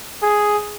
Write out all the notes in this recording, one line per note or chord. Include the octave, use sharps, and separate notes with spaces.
G#4